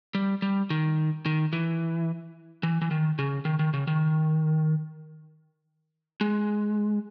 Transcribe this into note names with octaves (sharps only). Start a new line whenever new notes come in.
G3
G3
D#3
D#3
E3
E3
E3
D#3
C#3
D#3
D#3
C#3
D#3
G#3